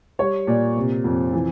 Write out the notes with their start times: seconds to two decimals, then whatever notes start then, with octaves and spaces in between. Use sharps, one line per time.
0.19 G3 C#5
0.47 A#2 D5
0.76 C3
1.04 F2
1.33 E3